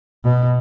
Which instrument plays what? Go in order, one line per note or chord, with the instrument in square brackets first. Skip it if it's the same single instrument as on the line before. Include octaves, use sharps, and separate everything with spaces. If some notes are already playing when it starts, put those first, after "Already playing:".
[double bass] B2